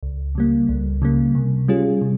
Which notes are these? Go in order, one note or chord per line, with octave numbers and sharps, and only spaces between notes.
C#2
C#3 G3 A#3
C#2
C#3 G3 A#3
C3
G3 C#4 F4 G#4
C3